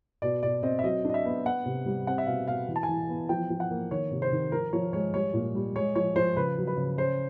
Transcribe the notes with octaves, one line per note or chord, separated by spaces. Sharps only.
B2 D5
B2 D5
C4 D#5
E5
F#3 D#5
D4 D#5
E5
B3
B3 F#5
C3
G3
C4 F#5
E5
B2 F5
B2 F5
E3
A5
G#5
E3
B3
F3 G5
F3
F#5
A#3
D#3 C#5
C3
C5
D#3
F3 A#4
F3 C#5
G#3 C#5
G3 C#5
A#2
G3
G#3 C#5
F3 C#5
F3 C5
C#3 B4
F#3
B4
C#3
C#4 C5